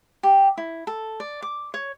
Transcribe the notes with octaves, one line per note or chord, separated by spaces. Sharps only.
G4
E4
A4
D5
D6
C#5